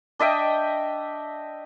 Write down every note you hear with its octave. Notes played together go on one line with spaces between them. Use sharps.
D4 D#5 E5 G5